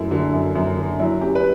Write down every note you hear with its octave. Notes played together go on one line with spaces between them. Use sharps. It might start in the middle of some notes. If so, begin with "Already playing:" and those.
Already playing: F#2 A3 E4
D3
F#2
F#2
D3
F#3 E4
C#4 G4
B4